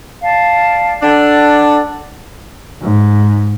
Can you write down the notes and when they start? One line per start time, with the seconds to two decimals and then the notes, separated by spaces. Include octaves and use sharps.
0.22 D5 F5 A5
1.01 D4 A4 F#5
2.81 G#2